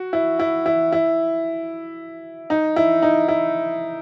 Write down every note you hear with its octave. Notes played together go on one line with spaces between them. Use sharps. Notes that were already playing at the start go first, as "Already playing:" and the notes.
Already playing: F#4
E4
E4
E4
E4
D#4
E4
D#4
E4